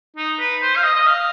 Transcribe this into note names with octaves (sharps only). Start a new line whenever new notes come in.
D#4
B4
C5
F5
D#5
D#5
F5